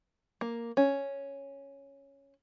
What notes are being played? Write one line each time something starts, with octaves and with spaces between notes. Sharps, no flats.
A#3
C#4